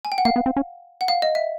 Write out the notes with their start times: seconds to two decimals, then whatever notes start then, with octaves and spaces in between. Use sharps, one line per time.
0.05 G#5
0.12 G5
0.18 F#5
0.25 A#3 F5
0.36 B3
0.46 C4
0.57 C#4
1.01 F#5
1.08 F5
1.22 D#5
1.35 E5